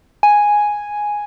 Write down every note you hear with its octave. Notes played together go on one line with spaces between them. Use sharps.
G#5